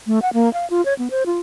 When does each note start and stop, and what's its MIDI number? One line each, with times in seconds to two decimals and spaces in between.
0.07 0.19 57
0.22 0.33 78
0.33 0.52 58
0.53 0.68 77
0.70 0.84 65
0.86 0.94 73
0.99 1.09 59
1.11 1.23 72
1.26 1.40 65